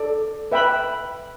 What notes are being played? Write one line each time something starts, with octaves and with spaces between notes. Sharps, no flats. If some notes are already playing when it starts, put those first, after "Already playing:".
Already playing: A4 D5
B4 E5 G5 B5